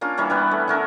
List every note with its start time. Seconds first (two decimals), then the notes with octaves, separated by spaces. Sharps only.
0.01 A#3 C#4 D4 F4
0.17 E3 G3 A#3 C#4
0.30 G3 B3 B4
0.51 A3
0.68 D3 C#4 A#4